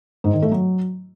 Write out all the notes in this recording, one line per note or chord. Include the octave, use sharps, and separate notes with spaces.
G#2
D#3
A3
F#3